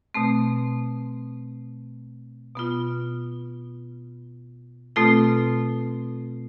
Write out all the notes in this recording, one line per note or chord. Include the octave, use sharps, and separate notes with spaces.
B2 A3 C4
B2 B3 F4
B2 A3 C4 F4 A4